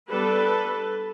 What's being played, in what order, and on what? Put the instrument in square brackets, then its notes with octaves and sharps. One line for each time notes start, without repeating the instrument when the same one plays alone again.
[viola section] G3 B3 D4 A4 B4